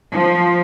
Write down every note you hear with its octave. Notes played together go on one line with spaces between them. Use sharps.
F3